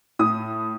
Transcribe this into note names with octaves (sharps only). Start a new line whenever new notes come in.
A2 D#6